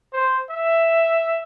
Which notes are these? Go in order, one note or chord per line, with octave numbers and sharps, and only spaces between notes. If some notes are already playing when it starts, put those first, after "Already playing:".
C5
E5